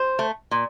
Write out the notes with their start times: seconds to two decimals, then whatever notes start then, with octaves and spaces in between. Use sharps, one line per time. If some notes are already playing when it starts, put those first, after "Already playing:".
Already playing: C5
0.19 A3
0.51 A#2